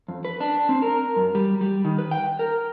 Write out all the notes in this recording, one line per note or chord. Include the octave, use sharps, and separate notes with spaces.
F2
B4
D4
C4
A#4
F#2
G3
G3
D#3
B4
G5
A#4